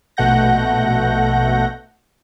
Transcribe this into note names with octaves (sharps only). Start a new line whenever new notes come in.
A#1 B2 A3 F#5 G6 A#6